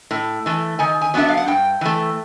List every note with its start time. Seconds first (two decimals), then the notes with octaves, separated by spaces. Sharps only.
0.11 A2
0.46 E3 A3
0.79 D#3 G#5
1.01 G#5
1.14 F#3 B3 D4 E5
1.29 F5
1.37 F#5
1.48 G2 G5
1.81 E3 A3